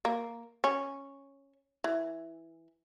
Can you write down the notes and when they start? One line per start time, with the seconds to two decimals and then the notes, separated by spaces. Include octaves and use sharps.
0.05 A#3
0.64 C#4
1.84 E3